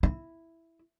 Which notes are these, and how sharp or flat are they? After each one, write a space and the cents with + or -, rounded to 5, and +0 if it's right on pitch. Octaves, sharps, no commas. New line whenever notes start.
E4 +0